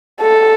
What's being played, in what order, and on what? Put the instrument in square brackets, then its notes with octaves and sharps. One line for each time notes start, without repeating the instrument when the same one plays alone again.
[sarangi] A4